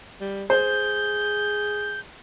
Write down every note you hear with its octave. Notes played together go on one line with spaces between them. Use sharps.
G3
G#4 C5 G6